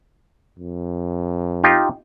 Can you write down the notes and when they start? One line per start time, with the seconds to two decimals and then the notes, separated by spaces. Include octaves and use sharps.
0.59 F2
1.64 D#4 F4 G4